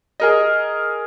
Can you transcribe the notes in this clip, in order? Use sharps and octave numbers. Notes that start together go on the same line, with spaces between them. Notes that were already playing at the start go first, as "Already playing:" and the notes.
G#4 A#4 D#5